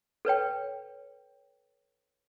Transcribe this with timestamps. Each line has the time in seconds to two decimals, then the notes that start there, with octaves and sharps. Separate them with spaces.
0.25 A4 B4 C#5 G5